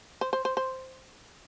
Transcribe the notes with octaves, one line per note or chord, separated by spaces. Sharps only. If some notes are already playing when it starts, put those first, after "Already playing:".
C5
C5
C5
C5